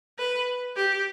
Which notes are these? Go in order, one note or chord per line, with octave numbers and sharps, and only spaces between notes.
B4
G4